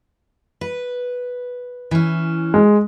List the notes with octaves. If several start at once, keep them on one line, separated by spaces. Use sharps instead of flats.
B4
E3 C#4
G#3